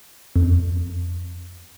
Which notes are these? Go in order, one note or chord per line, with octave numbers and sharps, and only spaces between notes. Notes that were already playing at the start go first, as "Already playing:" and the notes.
F2